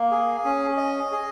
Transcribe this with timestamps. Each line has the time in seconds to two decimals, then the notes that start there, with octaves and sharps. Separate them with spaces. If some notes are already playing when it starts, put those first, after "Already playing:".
Already playing: A#3
0.11 G#4
0.44 C#4
0.77 D#5
1.12 G#4